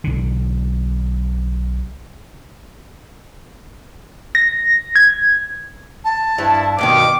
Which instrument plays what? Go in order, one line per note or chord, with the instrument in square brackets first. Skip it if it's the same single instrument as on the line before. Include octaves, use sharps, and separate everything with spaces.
[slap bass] B1 D3
[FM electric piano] A#6
G#6
[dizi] A5
[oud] G2 [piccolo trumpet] E4
[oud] G2 B2 D#3 [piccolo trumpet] D6